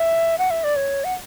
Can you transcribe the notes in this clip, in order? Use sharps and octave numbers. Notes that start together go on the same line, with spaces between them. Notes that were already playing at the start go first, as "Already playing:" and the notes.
Already playing: E5
F#5
E5
D5
C#5
F#5